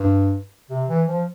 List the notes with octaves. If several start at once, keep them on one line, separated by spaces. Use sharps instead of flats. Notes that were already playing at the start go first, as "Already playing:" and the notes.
Already playing: G2
C3
E3
F3